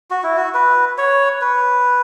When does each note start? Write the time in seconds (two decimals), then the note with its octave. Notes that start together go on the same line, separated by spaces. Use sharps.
0.10 F#4
0.23 E4
0.37 F#4
0.54 B4
0.98 C#5
1.41 B4